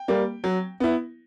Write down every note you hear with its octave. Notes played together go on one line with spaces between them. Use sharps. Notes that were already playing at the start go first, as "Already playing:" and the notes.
Already playing: G5
G3 A#3
F#3
B3 E4